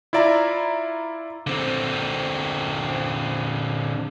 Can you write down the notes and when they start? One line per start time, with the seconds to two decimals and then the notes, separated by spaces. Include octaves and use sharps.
0.13 E4 F4 D5 E5 A#5
1.47 D3 C4